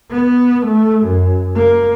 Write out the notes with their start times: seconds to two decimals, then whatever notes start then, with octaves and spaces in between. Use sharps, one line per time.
0.11 B3
0.66 A3
1.05 F#2
1.55 A#3